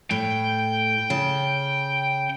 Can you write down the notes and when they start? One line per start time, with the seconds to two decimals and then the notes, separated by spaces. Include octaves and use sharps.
0.11 A2 G5
1.10 C#3 A5